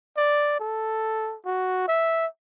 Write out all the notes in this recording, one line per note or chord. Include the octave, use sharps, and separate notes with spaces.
D5
A4
F#4
E5